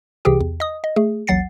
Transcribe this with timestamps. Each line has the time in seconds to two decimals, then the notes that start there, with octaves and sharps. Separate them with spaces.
0.25 C2 C3 E3 G4 G#4 G5
0.41 E2
0.60 D#5 D#6
0.84 D#5
0.96 A3 G#4
1.27 A1 D#2 F#3 F#5 A6 C7